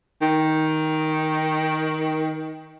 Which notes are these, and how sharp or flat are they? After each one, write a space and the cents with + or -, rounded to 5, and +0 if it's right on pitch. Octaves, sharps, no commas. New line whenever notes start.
D#3 +10